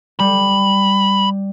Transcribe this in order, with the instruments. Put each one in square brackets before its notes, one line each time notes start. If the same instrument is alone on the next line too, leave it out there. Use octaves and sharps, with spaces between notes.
[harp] G3 [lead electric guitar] B5